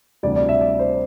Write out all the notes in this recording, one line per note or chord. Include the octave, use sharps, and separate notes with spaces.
D2 C3 E3 G3 D4 D5
D5
E5
D5
C5